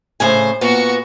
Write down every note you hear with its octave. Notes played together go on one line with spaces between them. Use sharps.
A2 C#3 C5 G#5
A#2 B3 F#4 C#6